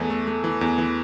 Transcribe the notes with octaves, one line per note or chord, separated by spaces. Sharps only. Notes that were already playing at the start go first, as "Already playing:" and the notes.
Already playing: E2 E3 A3
A3
A3
E3
E2
E3